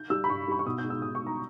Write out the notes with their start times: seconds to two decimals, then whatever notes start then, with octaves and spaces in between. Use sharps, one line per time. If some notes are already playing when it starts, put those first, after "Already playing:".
Already playing: G6
0.10 G3 E6
0.24 B5
0.28 G2 C#6
0.48 G3 B5
0.59 C#6
0.66 B2 D#6
0.78 G6
0.85 G#3
0.90 E6
1.02 B2 D#6
1.15 C#6
1.21 G#3
1.27 A#5